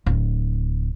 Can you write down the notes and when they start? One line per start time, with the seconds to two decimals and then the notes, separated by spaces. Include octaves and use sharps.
0.06 D1